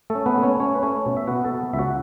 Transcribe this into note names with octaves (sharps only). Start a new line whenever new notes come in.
A3 A4
C#4
B3 B4
A3
C#4 C#5
C#4 C#5
B4
A3 C#4 C#5
B2
E5
B3 F#4 F#5
A4 A5
B3
C#2 E5
F#4 F#5